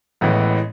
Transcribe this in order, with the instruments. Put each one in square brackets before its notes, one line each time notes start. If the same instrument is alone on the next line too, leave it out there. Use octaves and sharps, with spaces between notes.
[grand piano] A1 A2 E3 G#3 B3